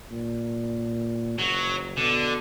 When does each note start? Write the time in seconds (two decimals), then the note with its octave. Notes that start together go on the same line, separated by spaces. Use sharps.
0.11 A#2
1.38 F#1 F#3
1.97 B2 D3